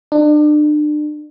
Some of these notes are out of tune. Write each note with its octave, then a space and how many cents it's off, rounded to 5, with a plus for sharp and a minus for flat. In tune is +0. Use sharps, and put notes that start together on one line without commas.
D4 +35